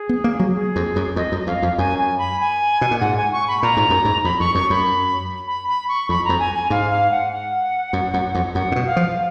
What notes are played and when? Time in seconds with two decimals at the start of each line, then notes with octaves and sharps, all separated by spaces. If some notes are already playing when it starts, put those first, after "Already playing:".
Already playing: G#4
0.09 B3
0.24 A#3
0.40 F#3
0.55 G#4
0.76 F2
0.96 F#2
1.16 F2 D#5
1.32 F#2
1.47 F2 F5
1.62 F2
1.78 F#2 G#5
1.98 G#5
2.19 B5
2.40 G#5
2.81 B2
2.91 A#2
3.01 G#2 F#5
3.17 G#5
3.32 C#6
3.48 B5
3.63 A#2 A#5
3.77 G#2
3.90 F#2
4.05 G#2
4.24 F2 B5
4.39 F2 C#6
4.55 F#2 C#6
4.70 F#2 B5
5.47 B5
5.68 B5
5.88 C#6
6.09 F2 B5
6.25 F2 A#5
6.39 G#5
6.55 G#5
6.70 G#2 F5
6.91 F5
7.11 F#5
7.32 F#5
7.93 F#2
8.14 F#2
8.35 F2
8.55 F#2 F#5
8.72 A#2
8.76 B2
8.87 F5
8.96 F3